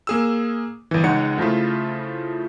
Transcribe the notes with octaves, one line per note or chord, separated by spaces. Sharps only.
A#3 G#4 E6
G1 E3
C#2 G#3 D#4 C#5 F#5 C#7
C#3 F3 A3 E4 F4